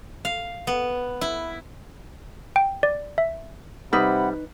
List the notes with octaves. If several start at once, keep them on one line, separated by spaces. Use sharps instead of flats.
F5
B3
E4
G5
D5
E5
C3 G3 D#4 B4 F#5 B5